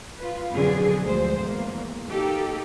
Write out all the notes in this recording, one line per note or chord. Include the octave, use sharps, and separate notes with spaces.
F4 B4
F2 B2 D3 F#3 G#4 D5
D2 F3 G#3 C5
E2 A#3
A#3 D#4 G4 A4